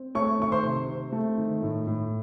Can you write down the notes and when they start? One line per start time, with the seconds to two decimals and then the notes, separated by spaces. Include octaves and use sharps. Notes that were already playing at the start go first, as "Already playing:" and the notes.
Already playing: C4
0.15 A3 C#5 C#6
0.39 D#3 C#6
0.52 C5 C6
0.64 C3
0.88 C4
1.12 A3
1.38 D#3
1.62 A2
1.87 A2